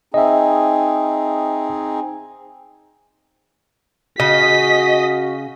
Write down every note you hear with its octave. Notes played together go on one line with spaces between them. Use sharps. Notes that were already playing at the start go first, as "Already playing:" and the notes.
C4 D#4 G#4 D#5 E5
C#3 F#4 D#5 B6